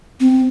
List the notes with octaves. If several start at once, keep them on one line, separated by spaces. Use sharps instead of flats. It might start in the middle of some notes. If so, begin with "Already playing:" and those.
C4